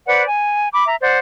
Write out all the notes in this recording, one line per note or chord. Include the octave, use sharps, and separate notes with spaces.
B4 C5 D5 F#5
G#5
B5 D6
E5 A#5
C5 D5 F#5